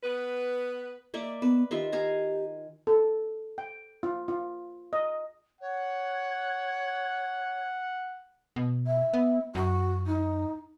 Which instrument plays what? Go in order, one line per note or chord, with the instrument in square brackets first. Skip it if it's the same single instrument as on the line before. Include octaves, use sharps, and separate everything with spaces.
[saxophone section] B3 B4
[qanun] A#3 D5 E5
[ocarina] B3 [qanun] B4
[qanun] D#3 F4 E5 [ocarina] G4
[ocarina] G4 [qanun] F5 G#5 A#5
[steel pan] A4
G5
F4
F4
D#5
[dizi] C#5 [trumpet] F#5
[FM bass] B2
[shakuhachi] E5
[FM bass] B3
[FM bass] F#2 [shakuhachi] F#4
[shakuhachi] D#4